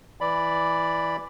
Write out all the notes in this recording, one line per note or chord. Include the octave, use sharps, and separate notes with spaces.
E3 D5 B5